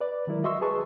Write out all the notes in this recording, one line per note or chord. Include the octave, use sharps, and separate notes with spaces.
B4 D5
D#3 F#3 G#3 E4 A#4
F#4 D#5 E5 C6 C#6 E6
G#4 B4 A5 C#6